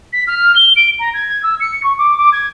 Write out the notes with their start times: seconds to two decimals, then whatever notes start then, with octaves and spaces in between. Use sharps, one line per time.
0.13 B6
0.27 F6
0.56 G7
0.76 D7
0.99 A#5
1.14 G#6
1.43 E6
1.60 C#7
1.83 C#6
1.98 D6
2.17 D6
2.33 G#6